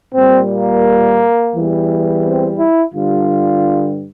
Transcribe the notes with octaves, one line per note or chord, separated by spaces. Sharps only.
A#2 G3 C4
A#3
E2 E3 G3
C4
E4
G2 D3 G3 F4